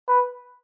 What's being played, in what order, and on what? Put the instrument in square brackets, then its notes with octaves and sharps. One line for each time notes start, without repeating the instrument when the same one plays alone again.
[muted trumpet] B4